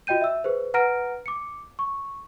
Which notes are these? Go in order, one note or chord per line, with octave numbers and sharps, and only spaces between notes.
F4 F#4 D#5 G5 G6 D#7
E5 E6
G#4 B4 C5
B4 F#5 A#5 F6 A#6 D7
D6 C#7
C#6